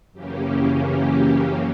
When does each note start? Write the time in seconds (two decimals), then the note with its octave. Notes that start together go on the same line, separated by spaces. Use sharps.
0.12 F#2 C#3 E3 A#3 C#4 G4
0.87 G4